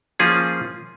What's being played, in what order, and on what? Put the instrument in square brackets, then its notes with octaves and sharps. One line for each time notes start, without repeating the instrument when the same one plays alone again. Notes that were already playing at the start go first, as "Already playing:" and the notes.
[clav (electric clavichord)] F3 A#3 C#4 F4 G#4